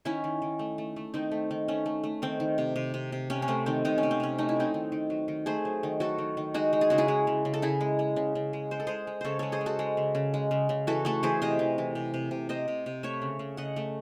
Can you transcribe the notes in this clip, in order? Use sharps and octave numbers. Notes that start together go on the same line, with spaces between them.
D#3 C#4 E4
D#3
D#3
A3
A3
A3
D#3 C4 D#4
A3
D#3
A3 C#4
A3
A3
D#3 C4
D#3
C3
C3
C3
C3
C3 C#4
C#4
A3 C4
D#3 C4
C3 D#4
C#4
C3
C4
C3 C#4
A3 D#4
E4
F#3 C4 D#4
D#3
D#3
F#3
D#3
A3 G#4 C5
F#3
D#3
F#3 F#4 A4
D#3
D#3
G#3 D#4 F#4
G#3
G#4
C#3 F#4
E4 G#4
G#3
C#3
C#3
A4
C#3 E4 G#4
G#3
G#3
C#3
C#3
G#3
G#3 C5
A4
G#3 G#4 C5
G#3
C#3 A4 C5 C#5
G#3 A4 C#5
G#4 C5
G#3
F#4 A4
G#3
C#3
C#3
G#3
C#3
C#3
E3 F#4 A4
A3 F#4 A4
E3 G#4 C5
C3 C5 D#5
E3
E3
C3
C3
C3
C3 C5 D#5
C3
C3
A3 C#5 E5
C#3
C#3
C#3 D#5 F#5
A3